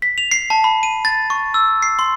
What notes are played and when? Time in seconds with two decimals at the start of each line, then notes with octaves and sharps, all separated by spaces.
0.02 B6
0.18 F7
0.32 C7
0.50 A5
0.64 B5
0.83 D#7
1.05 A6
1.30 C#6
1.54 E6
1.82 C7
1.99 C6